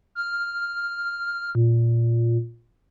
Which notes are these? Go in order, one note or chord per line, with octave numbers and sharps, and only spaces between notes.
F6
A#2